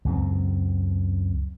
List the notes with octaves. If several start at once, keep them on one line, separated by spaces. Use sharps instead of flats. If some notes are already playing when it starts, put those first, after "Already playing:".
C#2 F#2 C4